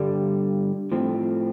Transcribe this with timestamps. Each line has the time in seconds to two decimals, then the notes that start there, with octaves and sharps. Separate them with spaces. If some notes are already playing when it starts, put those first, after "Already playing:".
Already playing: G2 D3 G3
0.92 A2 F3 C4